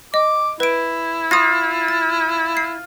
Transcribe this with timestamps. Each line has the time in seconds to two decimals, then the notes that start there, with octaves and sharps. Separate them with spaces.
0.14 D#5 D6
0.60 E4 B4 D7
1.31 F4 D#6 G#6 A#6
1.88 A6
2.57 C7